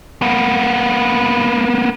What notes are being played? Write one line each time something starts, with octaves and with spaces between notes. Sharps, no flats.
A#3 B3